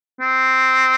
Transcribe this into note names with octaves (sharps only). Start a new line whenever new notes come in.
C4